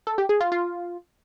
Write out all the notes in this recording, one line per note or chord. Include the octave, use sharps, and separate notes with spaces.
A4
G4
G#4
F4
F4